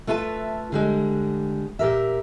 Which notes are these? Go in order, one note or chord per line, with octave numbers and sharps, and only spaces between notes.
A3 F4 B4 E5 A5
D3 G3 G#3
A#2 G4 A#4 E5